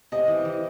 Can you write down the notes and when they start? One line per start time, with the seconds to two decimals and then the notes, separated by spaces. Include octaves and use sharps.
0.12 C3 D#5
0.28 E3
0.45 E3